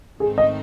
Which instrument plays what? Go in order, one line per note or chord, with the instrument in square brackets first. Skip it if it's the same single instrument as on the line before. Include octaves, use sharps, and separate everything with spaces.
[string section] G#2 D#3 A3 C4 D#4 [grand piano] G#4
[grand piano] D#5